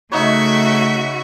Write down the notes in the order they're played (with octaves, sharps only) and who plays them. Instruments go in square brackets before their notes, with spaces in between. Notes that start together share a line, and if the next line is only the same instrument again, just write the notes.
[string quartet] C#3 F#4 E5 [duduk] A3 [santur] D#4 B4 C#5